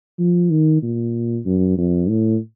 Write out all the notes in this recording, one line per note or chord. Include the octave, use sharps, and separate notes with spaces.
F3
D#3
A#2
F#2
F2
A2